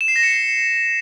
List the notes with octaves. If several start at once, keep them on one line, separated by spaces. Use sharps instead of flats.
E7
C7
A#6
C#7
C7